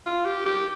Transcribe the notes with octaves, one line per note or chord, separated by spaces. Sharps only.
F4
G4
G4